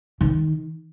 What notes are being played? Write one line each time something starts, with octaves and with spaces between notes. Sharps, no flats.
D#3